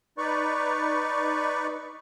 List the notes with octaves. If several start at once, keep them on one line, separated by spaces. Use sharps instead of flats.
D#4 B4 D5 C#6